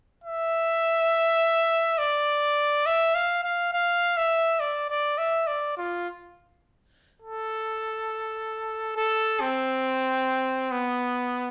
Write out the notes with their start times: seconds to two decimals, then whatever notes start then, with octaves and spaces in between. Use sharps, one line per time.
0.24 E5
1.98 D5
2.86 E5
3.15 F5
3.43 F5
3.73 F5
4.17 E5
4.60 D5
4.90 D5
5.18 E5
5.47 D5
5.77 F4
7.22 A4
8.97 A4
9.40 C4
10.71 B3